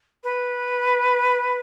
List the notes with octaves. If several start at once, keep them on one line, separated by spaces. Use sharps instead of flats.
B4